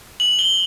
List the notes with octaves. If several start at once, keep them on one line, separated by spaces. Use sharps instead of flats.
F#7
G7